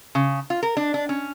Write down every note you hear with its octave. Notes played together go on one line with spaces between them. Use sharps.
C#3
F4
A#4
D4
D4
C#4